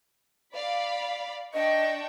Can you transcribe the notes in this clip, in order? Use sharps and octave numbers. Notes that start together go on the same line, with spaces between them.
D5 F5 B5
D4 D#5 G5 C#6